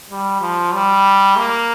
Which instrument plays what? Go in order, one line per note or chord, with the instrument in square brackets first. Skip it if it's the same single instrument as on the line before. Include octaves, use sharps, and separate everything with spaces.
[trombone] G3
F3
G3
A#3